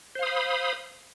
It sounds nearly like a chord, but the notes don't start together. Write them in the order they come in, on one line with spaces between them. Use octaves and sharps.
C5 F5 D#6 B5